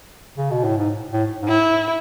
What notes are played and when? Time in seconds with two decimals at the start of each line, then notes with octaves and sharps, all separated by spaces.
0.38 C#3
0.51 B2
0.64 A2
0.77 G#2
1.13 A2
1.42 G#2
1.48 A2 E4